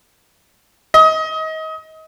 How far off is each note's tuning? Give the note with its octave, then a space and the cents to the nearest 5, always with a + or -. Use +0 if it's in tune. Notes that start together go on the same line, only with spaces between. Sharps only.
D#5 +30